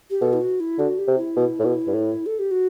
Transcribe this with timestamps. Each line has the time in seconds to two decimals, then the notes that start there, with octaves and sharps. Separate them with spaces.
0.10 G4
0.22 B2 A4
0.33 E4
0.41 F#4
0.60 E4
0.79 D3 F#4
0.98 G4
1.08 C3
1.17 E4
1.36 B2
1.60 A2
1.65 B2
1.87 G2
1.94 A2
2.26 A4
2.39 G4
2.51 F#4